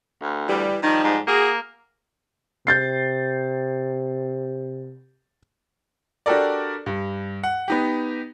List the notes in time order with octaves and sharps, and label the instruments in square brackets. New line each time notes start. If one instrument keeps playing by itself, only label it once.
[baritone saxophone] D2
[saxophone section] E3 G3
[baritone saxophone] D#3 [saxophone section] F3 G3 D#4
[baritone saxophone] G#2
[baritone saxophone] A#3 [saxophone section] F#4 G#4
[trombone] C3 [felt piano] G6 A6 C7
[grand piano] D4 F#4 G4 A4 A#4 D5
G2
F#5
B3 D#4 G4